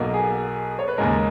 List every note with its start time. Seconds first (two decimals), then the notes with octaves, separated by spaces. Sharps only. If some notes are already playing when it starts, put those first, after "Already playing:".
Already playing: B1 B2 A#3
0.14 G#4
0.79 C#5
0.88 B4
0.98 D#2 C#3 G#3 A#4